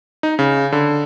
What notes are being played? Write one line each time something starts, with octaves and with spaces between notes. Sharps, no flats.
D#4
C#3
D3